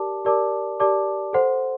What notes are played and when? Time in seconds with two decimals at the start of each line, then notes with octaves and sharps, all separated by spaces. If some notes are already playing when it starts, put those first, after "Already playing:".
Already playing: G4 A#4 D5 A5 D6
0.25 G4 A#4 D5 A5 D6
0.80 G4 A#4 D5 A5 D6
1.33 A4 C5 F#5 C6